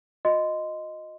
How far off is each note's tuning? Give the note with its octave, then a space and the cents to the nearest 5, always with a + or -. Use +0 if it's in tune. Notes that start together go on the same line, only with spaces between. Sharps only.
F#4 -45 D#5 +0 C6 -15